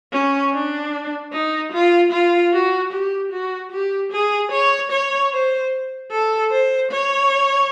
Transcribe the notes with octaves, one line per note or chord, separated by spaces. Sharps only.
C#4
D4
D#4
F4
F4
F#4
G4
F#4
G4
G#4
C#5
C#5
C5
A4
C5
C#5